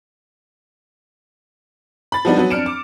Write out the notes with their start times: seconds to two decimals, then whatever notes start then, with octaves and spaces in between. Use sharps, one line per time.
2.12 B5 A6
2.25 F3 G3 B3 D4 D#4
2.37 F#3 B3
2.50 F2 D4 F6 C#7 D7 E7
2.66 D6